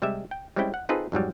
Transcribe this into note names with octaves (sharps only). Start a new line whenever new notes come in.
C3 G3 G#3 G4 E5
G5
G3 G#3 C4 C#4 E4 G5
F#5
C4 D#4 F4 G#4 A4 B4
F2 G#2 F#3 G3